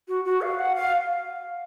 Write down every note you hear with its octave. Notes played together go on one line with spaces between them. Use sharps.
F#4
F#4
F5
F#5
F5